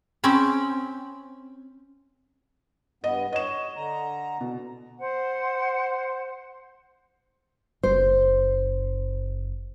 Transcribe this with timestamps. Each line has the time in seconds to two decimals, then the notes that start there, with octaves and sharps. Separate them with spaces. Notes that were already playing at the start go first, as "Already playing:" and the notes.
0.24 C4 C#4 B5
3.04 G2 B3 D#5
3.33 C#5 D#5 E7
3.76 D3 A#5
4.41 B2
4.99 C5 F#5
7.83 F#1 F#2 C5